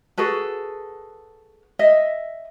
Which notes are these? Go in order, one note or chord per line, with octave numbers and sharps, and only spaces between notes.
F#4 G#4 A4 B4
D#5 E5